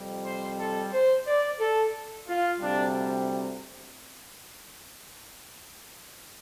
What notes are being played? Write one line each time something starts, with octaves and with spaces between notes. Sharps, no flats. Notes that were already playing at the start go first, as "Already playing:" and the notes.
Already playing: F2 C3 G3
C5
A4
C5
D5
A4
F4
D2 C3 G3 D4